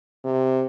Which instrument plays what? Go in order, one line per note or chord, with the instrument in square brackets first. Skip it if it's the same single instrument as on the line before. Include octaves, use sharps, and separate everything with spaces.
[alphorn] C3